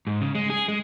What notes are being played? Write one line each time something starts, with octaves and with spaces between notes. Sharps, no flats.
G#2
C#3
G#3
G#4
G#3